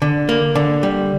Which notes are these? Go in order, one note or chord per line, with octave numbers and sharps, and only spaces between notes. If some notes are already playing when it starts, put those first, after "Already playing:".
D3
A#3
D3
G3